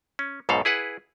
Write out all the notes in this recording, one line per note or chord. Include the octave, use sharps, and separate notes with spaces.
C#4
B1 G#2 B2 A4 F5
E4 G#4 B4 F#5